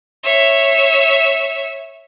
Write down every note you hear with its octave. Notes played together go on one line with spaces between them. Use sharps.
C#5 E5